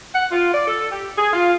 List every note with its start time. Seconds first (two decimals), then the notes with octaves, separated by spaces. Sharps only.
0.14 F#5
0.32 F4
0.53 D5
0.67 A4
0.92 G4
1.18 G#4
1.33 F4